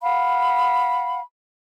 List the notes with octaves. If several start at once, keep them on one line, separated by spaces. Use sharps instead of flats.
F5 F#5 B5